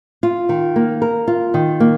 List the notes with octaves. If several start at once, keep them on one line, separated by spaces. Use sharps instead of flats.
F4
D#3
A#3
A#4
F4
D#3
A#3